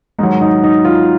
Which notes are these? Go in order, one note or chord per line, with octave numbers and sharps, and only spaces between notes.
G#2 D#3 F#3 D#4
D#4
D#4
F4